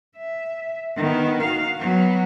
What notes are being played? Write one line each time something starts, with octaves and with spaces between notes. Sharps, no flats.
E5
D#3 B3
F#4 F5
F#3 B3